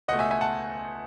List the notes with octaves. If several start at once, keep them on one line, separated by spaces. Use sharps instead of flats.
C#2 B2 A3 D#5 F#5
E5 G#5
E5 G#5
F#5 A5